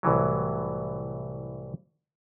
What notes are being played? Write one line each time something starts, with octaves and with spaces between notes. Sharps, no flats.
C2 A2 E3 F#3